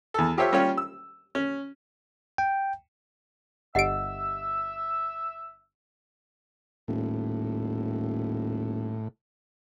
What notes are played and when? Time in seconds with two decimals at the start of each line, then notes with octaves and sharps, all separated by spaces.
0.14 E2 A4
0.37 F4 G4 A4 C5 C#5 E5
0.53 G3 C#4 F4 G4 C#5
0.77 E6
1.35 C#4
2.38 G5
3.75 G1 G4 D#5 E5 F#5 E6 D7
6.88 D#1 A2